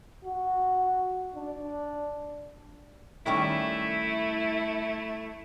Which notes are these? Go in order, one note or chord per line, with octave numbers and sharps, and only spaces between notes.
F#4
D4
D#3 G3 A3 C#4 E4